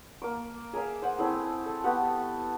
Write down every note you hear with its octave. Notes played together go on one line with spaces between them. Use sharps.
A#3 D6
G#4 A#4 E5 F5
C5 F#5
A3 C4 E4 G#4
A4
A3 B3 G4 F#5